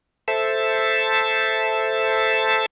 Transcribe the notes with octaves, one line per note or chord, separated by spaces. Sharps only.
A4 C5 E5 A5